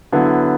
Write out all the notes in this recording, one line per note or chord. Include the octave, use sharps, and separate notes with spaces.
D3 F#3 B3 E4